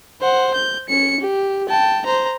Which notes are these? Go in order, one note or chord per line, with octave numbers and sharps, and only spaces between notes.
C5 F#5
G6
C#4 C#7
G4
G5 A5
C5 A#5